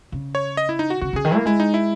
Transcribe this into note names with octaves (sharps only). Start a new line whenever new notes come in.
C#3
C#5
D#5
E4
D#4
F#4
C#3 F#4
C#3 G#4
D#3
A#3 E4
G#3 E4
D#4
E4